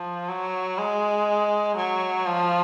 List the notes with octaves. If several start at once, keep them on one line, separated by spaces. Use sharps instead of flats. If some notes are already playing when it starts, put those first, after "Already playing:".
Already playing: F3
F#3
G#3
F#3
F3